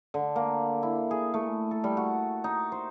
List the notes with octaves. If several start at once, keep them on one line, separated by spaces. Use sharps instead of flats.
D3
A#3
E4
G#4
A3
A4
G3
F#4
D#4
C5